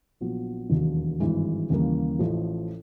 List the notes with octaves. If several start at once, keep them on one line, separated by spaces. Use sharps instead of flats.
A#1 A#2 F#3 B3
E1 D#2 D#3 F#3
G#1 G2 E3 G#3
D#2 C#3 E3 G3 A#3
A1 A2 F3